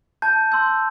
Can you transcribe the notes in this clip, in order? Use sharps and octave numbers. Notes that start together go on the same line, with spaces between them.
A5 G6
C6 E6 G6